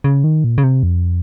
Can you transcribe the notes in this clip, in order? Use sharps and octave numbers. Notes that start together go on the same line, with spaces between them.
C#3
D#3
A#2
C#3
C3
F2